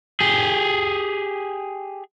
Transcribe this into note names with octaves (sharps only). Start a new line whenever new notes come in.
G4 G#4